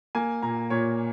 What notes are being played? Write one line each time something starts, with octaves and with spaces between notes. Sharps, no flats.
A#3 G#5
A#2 A#5
A#2 C#5